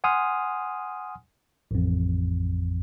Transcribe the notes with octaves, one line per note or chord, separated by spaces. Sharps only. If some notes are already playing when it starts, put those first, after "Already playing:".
F#5 G#5 C6 D#6 F6
A1 F2